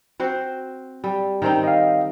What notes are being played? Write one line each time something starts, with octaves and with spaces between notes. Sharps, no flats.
C4 F#4 C5
G3
D#3 C4 D#4
D#5 F5